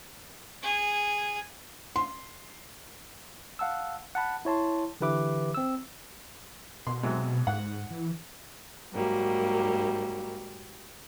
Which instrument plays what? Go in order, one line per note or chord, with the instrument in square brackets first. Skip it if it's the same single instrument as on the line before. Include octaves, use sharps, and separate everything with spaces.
[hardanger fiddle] G#4
[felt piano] C6
[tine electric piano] F5 F#5 A5 E6
F#5 A5 B5
E4 C#5 A5 C6
D3 E3 G4 B4 E5 D6
C4 E6
[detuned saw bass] B2 [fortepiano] C6
[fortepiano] G#2 C3 F#3
[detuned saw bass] G#2 [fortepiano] F#5
[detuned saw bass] E3
[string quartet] G#2 F#3 G3 A#3